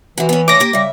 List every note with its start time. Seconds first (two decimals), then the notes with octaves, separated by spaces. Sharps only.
0.18 C3 E3 F#4
0.29 B3 C#4
0.48 A2 C#5 D6 A#6
0.60 A#3 G4
0.73 C#3 G3 E5